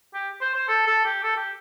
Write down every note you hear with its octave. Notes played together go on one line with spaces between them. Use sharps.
G4
C5
C5
A4
A4
G4
A4
G4